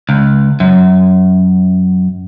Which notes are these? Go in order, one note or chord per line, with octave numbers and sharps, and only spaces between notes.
C#2
F#2